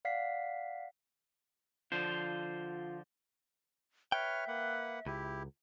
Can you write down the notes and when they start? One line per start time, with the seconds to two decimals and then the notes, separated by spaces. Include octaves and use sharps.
0.05 D5 F5 F#5 B6 C7
1.92 D3 F3 F4 C5
4.12 B4 C#5 E5 G5 F6
4.48 A#3 B4 F#5
5.06 C#2 E4 G4